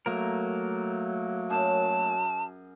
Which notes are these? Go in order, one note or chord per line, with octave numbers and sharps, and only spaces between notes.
F#3 A3 A#3 A#4
F#2 G#4 A5